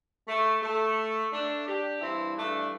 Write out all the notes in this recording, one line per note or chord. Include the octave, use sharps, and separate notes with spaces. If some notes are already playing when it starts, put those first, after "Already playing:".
A3
A3
A3 D4
D4 G4
G2 E3 C4 E4
A3 D4